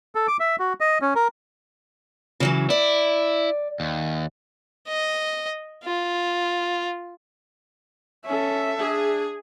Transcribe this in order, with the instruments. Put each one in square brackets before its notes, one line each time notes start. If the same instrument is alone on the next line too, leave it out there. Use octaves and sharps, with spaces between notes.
[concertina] A4
D6
E5
F#4
D#5
C#4
A#4
[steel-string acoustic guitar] C#3 E3 F#3
[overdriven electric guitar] E4 [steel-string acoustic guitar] D5
[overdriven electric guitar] D#2
[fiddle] D#5
F4
[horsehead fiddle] C#4 A4 [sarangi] E5
[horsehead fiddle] D4 [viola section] G#4